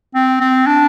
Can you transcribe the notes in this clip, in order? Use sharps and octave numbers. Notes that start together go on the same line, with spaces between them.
C4
C4
D4